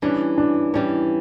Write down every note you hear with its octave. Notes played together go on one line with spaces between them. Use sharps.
E3 G3 C#4 D4
D4
E3 G3 C#4 D4